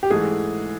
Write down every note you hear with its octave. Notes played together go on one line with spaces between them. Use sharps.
G4
G#2 E3 A3 G#4